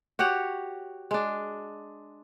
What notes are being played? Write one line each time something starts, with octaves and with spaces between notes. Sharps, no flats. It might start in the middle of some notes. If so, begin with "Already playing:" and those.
F#4 G4 C#5 F#5
G#3 D4